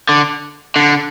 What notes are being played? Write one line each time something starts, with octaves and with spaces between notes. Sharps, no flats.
D3
D3